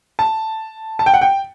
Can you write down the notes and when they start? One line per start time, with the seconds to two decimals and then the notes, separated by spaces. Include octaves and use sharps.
0.19 A5
0.99 A5
1.06 G5
1.14 F#5
1.21 G5